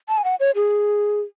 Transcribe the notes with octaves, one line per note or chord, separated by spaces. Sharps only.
A5
G#5
F#5
C#5
G#4